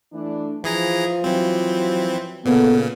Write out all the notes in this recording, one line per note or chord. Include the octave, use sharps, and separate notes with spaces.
E3 A3 D4
E3 F3 G#4 A#5
E3 F#3 C4
A#2 C#3 B3 A4